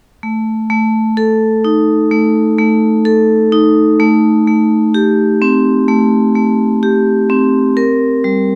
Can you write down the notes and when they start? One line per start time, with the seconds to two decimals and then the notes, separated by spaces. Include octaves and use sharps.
0.23 A3
0.70 A3
1.17 A4
1.64 D#4
2.11 A3
2.58 A3
3.05 A4
3.52 D#4
4.00 A3
4.47 A3
4.94 G4
5.42 C4
5.88 A3
6.35 A3
6.83 G4
7.30 C4
7.77 A#4
8.24 G3